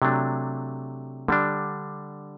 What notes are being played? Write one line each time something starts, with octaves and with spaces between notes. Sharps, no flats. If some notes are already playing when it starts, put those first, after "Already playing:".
C3 F#3 A3 D4
D3 G3 D4